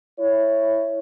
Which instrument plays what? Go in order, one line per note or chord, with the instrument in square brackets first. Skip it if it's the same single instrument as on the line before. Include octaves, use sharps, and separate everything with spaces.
[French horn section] E4 C#5